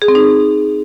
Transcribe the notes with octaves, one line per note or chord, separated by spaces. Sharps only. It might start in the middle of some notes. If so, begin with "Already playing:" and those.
G#4
C4
D#4